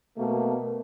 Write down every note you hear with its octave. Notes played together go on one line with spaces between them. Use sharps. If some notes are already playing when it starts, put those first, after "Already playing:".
B2 A3 A#3